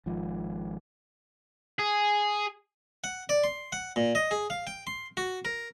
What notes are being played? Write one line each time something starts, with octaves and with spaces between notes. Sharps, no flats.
G#1 G#2 F3
G#4
F#5
D5
C6
F#5
A#2
D#5
G#4
F5
G5
C6
F#4
A#4